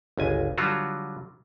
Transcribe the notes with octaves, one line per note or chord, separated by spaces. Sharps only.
G1 C#2 G#5
D3 F#3 G3 F4 F#4